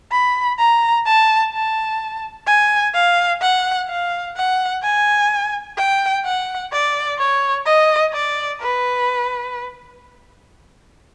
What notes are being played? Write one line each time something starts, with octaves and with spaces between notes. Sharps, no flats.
B5
A#5
A5
A5
G#5
F5
F#5
F5
F#5
G#5
G5
F#5
D5
C#5
D#5
D5
B4